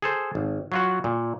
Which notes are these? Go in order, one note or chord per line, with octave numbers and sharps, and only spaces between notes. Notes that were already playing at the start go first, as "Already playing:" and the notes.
G#4 A4 C5
G#1
F#3 F4 F#4
A#2